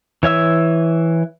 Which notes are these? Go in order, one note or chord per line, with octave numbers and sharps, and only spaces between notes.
E3 C#5 E5 E6